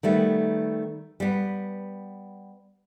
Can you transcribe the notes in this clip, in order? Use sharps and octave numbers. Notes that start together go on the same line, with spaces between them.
D#3 G3 A3 B3
G3 B3